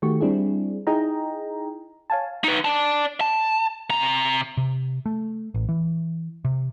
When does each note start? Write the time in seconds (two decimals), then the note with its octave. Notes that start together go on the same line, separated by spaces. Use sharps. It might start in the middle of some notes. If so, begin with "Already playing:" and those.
0.02 D#3 A3 F#4 G4 C#6
0.21 G3 C4 D4 E4 G#4
0.87 D#4 E4 G#4 D#5 G5 A#5
2.10 C#5 F5 G#5 A5
2.44 D#4 B4
2.65 D5 A5
3.21 A5
3.90 C3 A#5
4.57 C3
5.06 A3
5.54 A1
5.69 E3
6.45 C3